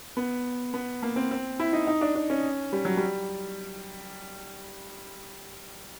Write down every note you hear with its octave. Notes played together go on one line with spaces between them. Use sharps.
B3
B3
A#3
C4
C4
E4
D#4
D#4
D4
D4
C#4
G3
F#3
G3